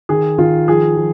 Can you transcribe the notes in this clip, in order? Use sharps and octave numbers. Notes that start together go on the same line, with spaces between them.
D#3 G#4
D#3 F4
F3 G#4
F3